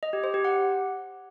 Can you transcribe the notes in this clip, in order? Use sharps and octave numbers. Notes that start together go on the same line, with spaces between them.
D#5
G4
C5
G4
F#5